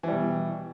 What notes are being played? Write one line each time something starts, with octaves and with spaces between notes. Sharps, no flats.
B2 E3 G3